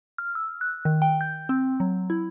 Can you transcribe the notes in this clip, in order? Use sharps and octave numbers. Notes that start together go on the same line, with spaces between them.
F6
E6
F#6
D#3
G5
G6
C4
F#3
E4